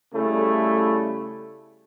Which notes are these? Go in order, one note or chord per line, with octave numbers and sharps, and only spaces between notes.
C#3 G3 A3 E4 A4